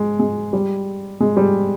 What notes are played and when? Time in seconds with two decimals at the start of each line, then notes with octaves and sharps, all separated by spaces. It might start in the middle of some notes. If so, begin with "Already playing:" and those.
Already playing: G#3
0.19 G#3
0.53 G3
1.20 G#3
1.37 G3